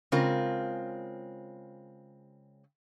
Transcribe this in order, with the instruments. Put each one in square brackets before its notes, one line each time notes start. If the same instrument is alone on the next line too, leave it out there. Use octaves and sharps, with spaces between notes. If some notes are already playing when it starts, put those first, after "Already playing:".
[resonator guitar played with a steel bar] C#3 G#3 C4 F4 A#4